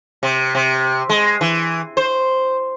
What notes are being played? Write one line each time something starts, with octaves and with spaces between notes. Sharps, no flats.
C3
C3
G#3
E3
C5